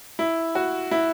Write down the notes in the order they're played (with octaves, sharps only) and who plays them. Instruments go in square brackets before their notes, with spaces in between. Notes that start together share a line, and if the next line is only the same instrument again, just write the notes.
[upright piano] E4
F#4
E4